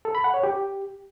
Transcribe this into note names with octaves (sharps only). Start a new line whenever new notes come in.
A4
B5
F#5
C#5
G4